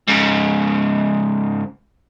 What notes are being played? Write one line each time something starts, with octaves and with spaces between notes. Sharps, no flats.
G#2 C#3